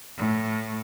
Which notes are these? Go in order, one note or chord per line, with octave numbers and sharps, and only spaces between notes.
A2